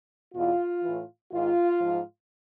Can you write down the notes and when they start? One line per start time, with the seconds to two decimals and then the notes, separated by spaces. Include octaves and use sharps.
0.33 E2 B2 F4
0.82 A2 E3
1.31 G#2 D#3 F4
1.80 G#2 F3